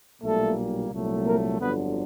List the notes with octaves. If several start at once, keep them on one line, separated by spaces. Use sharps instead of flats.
B1 A#2 G3 A3 A#3 A4
C2 A#2 F#3 A3
A#3 A#4
G1 F2 D3 F#3 B3 B4